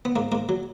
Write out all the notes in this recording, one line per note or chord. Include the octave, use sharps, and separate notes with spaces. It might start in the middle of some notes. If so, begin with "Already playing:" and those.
B3
G#2 A#3
G#2 A#3
F#3